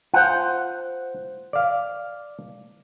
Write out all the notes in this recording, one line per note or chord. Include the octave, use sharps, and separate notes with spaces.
F4 C5 F#5
D5 F5